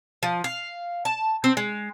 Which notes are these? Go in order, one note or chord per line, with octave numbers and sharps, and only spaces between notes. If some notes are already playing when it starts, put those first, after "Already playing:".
F3
F5
A5
C4
G#3